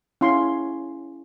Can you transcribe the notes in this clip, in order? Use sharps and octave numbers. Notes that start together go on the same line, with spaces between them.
C#4 E4 F5 C6